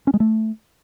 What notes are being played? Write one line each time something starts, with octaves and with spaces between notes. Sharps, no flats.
C#4
G#3
A3